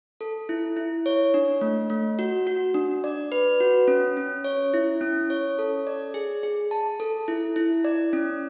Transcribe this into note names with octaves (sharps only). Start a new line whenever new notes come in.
A4
E4
E4
C#5
D4
A3
A3
F#4
F#4
D4
D5
B4
F#4
C#4
C#4
C#5
E4
C#4
C#5
A4
D5
G#4
G#4
A5
A4
E4
E4
D5
C#4